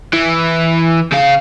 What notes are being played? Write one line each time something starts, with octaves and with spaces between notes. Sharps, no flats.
E3
C#3 F5